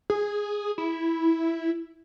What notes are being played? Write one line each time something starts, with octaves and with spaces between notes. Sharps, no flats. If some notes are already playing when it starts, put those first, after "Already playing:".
G#4
E4